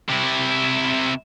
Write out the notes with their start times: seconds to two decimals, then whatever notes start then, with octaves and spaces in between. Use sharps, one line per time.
0.09 C3 E4